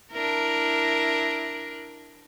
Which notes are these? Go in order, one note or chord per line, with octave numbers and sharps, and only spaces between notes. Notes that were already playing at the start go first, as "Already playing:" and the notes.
D4 E4 A#4